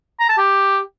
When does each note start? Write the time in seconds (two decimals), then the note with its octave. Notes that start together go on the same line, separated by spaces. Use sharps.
0.19 A#5
0.28 A5
0.37 G4